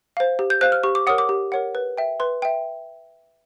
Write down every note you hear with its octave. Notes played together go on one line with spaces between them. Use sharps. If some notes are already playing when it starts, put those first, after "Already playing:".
C5 F5
G4
G6
C5 F5 F#6
F6
G4 C#6
D6
A#4 C#5 F#5 D#6
D6
G4
A#4 C#5 F#5
B4
E5 G5
B4 C6
E5 G5